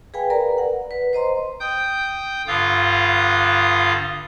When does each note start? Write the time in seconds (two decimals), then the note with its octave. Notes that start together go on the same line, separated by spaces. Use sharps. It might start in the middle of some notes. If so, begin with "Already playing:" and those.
0.14 G#4 B4 F5 G5 G#5 B5
0.30 A#4 B4 D5 A#5
0.58 F#5
0.91 B4
1.13 C5 D#5 A#5 C6
1.60 G5 D#6 G6
2.47 G2 D3 F4 F5 D#6